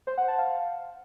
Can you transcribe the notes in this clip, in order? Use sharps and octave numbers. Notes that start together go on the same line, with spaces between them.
C5
F#5
A5
F5